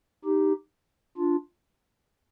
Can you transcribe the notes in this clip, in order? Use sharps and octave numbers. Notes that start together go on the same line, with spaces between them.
D#4 G4
D4 F4